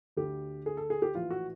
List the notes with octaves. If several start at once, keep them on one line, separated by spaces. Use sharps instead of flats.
D2 D3 G4
G#4
A4
G#4
G4
A#1 A2 E3 F4
F#4